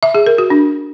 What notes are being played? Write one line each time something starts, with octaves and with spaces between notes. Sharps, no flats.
E5
G#4
A#4
F#4
D4